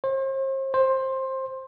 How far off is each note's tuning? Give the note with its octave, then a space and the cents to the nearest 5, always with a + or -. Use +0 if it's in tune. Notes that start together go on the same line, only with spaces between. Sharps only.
C5 +40
C5 +15